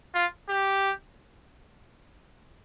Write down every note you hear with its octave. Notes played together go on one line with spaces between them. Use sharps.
F4
G4